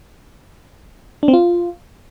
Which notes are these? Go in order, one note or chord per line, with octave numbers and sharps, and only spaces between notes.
D4
C4
F4